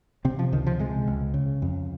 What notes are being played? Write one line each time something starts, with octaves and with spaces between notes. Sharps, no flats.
C3 C4
F3
C#2 D#3
F3
C3 G#3
C#2
C#3
F2